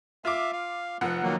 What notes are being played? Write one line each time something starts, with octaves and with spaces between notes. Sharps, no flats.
F4 E5 F5 D6
F5
F1 F3 F#5
D#3 F#3 A#3